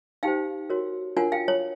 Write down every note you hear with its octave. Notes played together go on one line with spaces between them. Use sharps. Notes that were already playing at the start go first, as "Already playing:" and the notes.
D#4 G4 C5 F5 G5
F#4 A#4 C#5
D4 F4 A#4 C#5 F#5 G#5
F5 G5
C#5